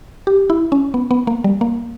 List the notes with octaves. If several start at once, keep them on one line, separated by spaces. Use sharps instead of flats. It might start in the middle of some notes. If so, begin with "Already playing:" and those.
G4
E4
C#4
B3
B3
A#3
G3
A#3